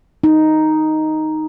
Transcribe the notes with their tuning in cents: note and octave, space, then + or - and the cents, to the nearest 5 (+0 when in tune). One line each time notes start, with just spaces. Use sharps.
D#4 +0